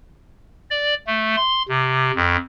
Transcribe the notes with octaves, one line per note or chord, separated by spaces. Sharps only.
D5
A3
C6
C3
F2